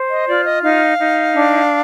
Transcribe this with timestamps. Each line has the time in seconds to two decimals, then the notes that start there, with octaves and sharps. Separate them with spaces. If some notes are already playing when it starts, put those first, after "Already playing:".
Already playing: C5
0.09 D#5
0.27 F4 D5
0.44 D#5
0.62 D#4 F5
0.98 D#4
1.34 D4